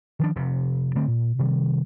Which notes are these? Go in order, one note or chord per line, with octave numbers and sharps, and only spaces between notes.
D#3 F3 D4
F1 C3
D3 A3 C4
A#2
C3 D#3 G3